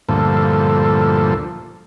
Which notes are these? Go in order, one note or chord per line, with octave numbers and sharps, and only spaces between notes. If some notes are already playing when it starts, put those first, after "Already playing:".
D2 G2 A#2 F3 A4